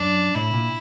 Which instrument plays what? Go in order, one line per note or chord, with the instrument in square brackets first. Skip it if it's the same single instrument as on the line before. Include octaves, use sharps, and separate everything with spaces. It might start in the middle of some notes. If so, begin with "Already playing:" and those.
Already playing: [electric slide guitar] F#2 [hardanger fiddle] D4
[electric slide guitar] A2 [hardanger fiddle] E4
[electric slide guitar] A#2